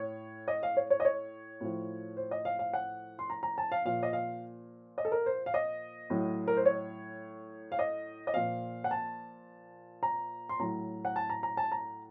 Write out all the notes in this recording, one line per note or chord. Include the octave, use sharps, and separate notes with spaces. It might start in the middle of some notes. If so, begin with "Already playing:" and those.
Already playing: A2 C#5
D#5
F5
C#5
C#5
D#5
C#5
A2 F3
C5
D#5
F5
F5
F#5
C6
A#5
A#5
A5
F5
A#2 F3 F5
D#5
F5
D#5
A4
A#4
C5
F5
D#5
A2 F#3
A#4
C5
C#5
F5
D#5
D#5
A#2 F3 F5
F#5
A5
A#5
C6
A2 F#3 A#5
F#5
A5
A#5
A#5
A5
A#5